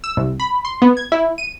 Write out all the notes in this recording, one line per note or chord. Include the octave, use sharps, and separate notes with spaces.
E6
C2
B5
C6
B3
G#6
E4
D#7